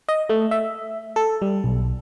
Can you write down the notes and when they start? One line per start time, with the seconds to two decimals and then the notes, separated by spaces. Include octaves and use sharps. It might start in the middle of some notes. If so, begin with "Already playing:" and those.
0.09 D#5
0.29 A3
0.51 E5
1.16 A4
1.42 G3
1.64 B1